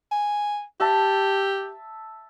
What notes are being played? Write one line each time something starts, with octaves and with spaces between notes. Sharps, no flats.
G#5
G4 E5 A5